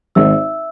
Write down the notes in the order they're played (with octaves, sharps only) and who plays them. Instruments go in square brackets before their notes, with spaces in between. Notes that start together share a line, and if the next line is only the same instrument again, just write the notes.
[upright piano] G#1 [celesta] E5 E6